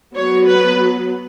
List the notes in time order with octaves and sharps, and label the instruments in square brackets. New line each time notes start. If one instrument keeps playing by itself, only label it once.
[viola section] F#3 B3 C#5
B4